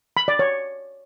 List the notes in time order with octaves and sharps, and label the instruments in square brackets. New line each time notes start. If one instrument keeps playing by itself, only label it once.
[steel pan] B5
D5
C#5